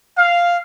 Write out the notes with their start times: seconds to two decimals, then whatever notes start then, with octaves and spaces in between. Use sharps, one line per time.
0.17 F5